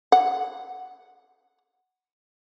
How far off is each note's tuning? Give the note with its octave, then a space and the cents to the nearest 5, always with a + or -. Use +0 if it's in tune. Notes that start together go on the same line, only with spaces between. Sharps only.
F#5 +0